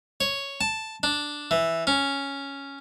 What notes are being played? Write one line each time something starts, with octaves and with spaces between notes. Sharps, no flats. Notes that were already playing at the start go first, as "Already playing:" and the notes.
C#5
A5
D4
E3
C#4